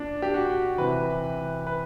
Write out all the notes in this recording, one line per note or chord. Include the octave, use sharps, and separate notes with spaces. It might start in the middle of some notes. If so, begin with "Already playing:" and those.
Already playing: A#2 D4
G4
F#4
C3 E3 B4
B4